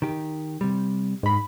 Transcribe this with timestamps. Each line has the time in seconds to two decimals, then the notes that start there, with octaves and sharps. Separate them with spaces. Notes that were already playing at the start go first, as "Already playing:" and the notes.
0.02 D#3 G4
0.61 C3 G3
1.23 G#2 B5